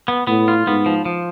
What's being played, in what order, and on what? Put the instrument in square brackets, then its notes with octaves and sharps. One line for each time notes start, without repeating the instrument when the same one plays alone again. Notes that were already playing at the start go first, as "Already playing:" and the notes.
[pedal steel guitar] B3
[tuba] A2 [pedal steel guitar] B3
[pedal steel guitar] F4
[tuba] G#2 [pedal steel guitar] B3
[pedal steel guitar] F3
F3